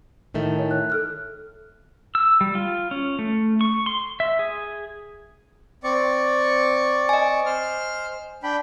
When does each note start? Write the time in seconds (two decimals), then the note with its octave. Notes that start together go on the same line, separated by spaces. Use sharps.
0.34 A2 D#3 A3
0.57 D#4 C#5
0.71 F#6
0.90 A4 F6 F#6
2.15 E6
2.41 G3
2.55 F4
2.91 C#4
3.19 A3
3.61 C#6
3.86 C6
4.20 E5
4.39 G#4
5.84 C4 D5 C#6
7.09 D#5 G#5
7.46 C5 F6
8.43 D4 G5 B5